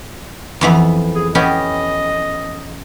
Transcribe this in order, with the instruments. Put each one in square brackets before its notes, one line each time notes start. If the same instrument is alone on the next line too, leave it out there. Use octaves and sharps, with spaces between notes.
[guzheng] F2 E3 B3
[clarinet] G#4
[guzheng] B3 C#4 G4 [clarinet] D#5